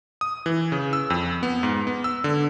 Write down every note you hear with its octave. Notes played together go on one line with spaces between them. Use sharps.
D#6
E3
C#3
E6
F2
B3
G#2
B3
E6
D3